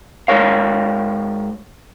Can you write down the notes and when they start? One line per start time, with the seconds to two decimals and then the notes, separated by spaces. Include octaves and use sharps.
0.28 G#2 C#3 A#4 C#5 F5